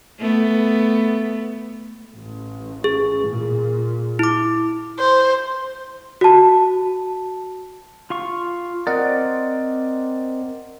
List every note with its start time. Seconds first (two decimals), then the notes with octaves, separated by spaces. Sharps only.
0.19 A3 B3
2.16 A1
2.84 G#4
3.26 A#2
4.19 E4 D6
4.99 C5
6.21 F#4 A5
8.10 F4 F5 C#6
8.87 C4 A#4 D5 D#5 F#5